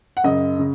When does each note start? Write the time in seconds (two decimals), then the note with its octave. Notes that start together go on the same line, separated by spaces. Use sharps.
0.17 F#5
0.24 F#2 C#3 D#5
0.59 C#3